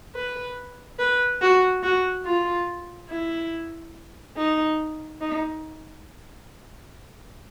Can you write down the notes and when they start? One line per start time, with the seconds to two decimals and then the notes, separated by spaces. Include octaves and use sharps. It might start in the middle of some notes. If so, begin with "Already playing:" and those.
0.15 B4
0.99 B4
1.42 F#4
1.83 F#4
2.25 F4
3.10 E4
4.37 D#4
5.21 D#4